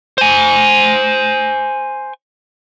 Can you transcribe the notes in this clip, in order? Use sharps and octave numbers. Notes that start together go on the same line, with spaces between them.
C5 G#5